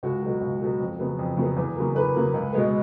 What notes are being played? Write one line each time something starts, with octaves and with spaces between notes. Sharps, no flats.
C#2 F#4
B2 F#3
C#2
B2 F#3
F2
C#3 F#3 B3
F2
C#3 F#3 B3
E2
C#3 F#3 A#3
E2 B4
C#3 F#3 A#3
C#2
B2 G#3 B3